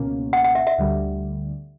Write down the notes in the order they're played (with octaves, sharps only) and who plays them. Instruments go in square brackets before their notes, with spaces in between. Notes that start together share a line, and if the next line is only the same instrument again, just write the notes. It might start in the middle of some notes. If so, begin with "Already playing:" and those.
Already playing: [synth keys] C#2 B2 A#3 C#4
[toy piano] F#5
F#5
E5
E5
[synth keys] D2 D3 G3